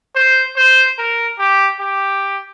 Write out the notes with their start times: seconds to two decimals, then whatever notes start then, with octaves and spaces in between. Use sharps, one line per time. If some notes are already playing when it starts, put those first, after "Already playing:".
0.16 C5
0.57 C5
0.98 A#4
1.39 G4
1.80 G4